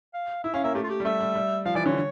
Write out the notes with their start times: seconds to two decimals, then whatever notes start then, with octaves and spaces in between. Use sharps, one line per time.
0.14 F5
0.44 E4 E5
0.54 C#4 F5
0.64 A#3 E5
0.75 A3 G4
0.84 F4
0.89 G4
1.00 G3
1.05 A3 E5
1.21 G3
1.35 G3
1.65 F3 F5
1.75 E3 D5
1.86 D3 C#5